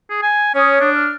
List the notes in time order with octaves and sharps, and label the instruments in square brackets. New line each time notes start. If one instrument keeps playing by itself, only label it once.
[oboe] G#4
G#5
[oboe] C#4 [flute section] C#5 D#6
[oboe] D4
[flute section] F6